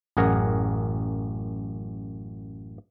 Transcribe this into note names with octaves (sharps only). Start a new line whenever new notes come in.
A1 F#2 G#4 A#4 F#5 A#5